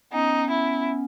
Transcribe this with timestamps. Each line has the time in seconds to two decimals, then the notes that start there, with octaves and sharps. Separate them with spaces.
0.12 B3 C#4 D#4
0.50 E4